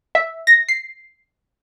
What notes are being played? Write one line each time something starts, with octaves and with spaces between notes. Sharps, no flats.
E5
A#6
C7